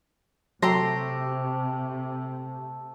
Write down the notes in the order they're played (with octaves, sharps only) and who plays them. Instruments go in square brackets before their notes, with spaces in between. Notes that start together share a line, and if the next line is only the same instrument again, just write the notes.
[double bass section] C3 [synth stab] F#3 C6 [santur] A3 E5 [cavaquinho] G4 A#5